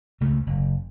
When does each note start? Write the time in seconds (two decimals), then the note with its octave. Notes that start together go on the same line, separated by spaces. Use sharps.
0.21 C#2 C#3 A3
0.47 F#1